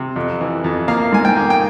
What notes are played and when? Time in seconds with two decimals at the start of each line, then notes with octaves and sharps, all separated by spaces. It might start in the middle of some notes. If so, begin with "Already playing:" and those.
Already playing: C3
0.16 F2
0.41 E3
0.64 F2
0.88 A#3 F5
1.13 G#2 G#5
1.25 G5
1.37 A#3
1.50 G5